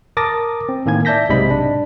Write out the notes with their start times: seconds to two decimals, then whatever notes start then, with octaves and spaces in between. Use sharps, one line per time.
0.17 A#4 A5 D6 D#6 A6 A#6
0.69 C4
0.86 A2 D#3 A#3 G#5 G#6
1.05 D5 E5 A5 G6 A#6 B6
1.29 B1 G#2 C3 D#5 B5 B6
1.51 D4